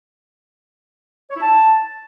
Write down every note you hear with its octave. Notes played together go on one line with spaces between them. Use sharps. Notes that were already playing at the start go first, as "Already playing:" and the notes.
C#5
E4
A5